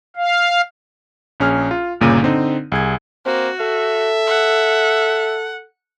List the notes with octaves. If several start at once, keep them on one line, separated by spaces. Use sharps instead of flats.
F5
A#1 C#4 G#4 F6
F4
G1 A#2 C#3 A#3 D#7
D3 C4 D#4
C2 G#4 G#6
A#3 C4 F#4
A4 E5
F#5